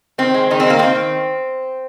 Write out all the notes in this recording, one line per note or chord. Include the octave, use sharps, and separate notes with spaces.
D#3 C4
G#3
D#3 D#4
C4
G#3
A#3
D#3 C4